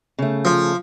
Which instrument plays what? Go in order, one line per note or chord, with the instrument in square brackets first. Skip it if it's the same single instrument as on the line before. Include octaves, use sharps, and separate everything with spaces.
[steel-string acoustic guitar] C#3 A3
[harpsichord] F3